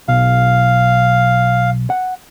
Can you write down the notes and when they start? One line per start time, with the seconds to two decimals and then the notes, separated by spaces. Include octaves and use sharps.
0.08 B1 F5
1.90 F#5